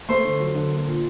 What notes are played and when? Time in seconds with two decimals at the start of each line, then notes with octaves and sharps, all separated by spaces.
0.09 A3 C5 C6
0.25 D3
0.40 F#3
0.55 D3
0.71 A#3
0.87 A#2